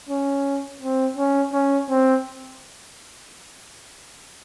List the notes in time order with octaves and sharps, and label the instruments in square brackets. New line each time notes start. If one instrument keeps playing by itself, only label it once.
[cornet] C#4
C4
C#4
C#4
C4